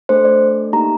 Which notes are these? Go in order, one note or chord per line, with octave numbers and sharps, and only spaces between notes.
A3 D4 A4 C5
D5
A#3 D#4 G4 A#5